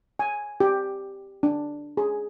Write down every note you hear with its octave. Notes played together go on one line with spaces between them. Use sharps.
G#5
G4
D4
G#4